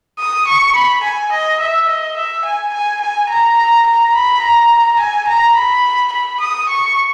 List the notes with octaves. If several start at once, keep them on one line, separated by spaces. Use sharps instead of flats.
D#6
C#6
B5
G#5
D#5
E5
D#5
E5
G#5
G#5
G#5
A#5
A#5
A#5
B5
A#5
G#5
A#5
B5
B5
D#6
C#6